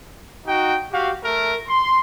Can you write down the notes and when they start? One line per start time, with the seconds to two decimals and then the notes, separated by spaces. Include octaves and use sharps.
0.46 D#4 F#4 G5
0.93 F#4 G4 F5
1.23 A3 A#4
1.68 C6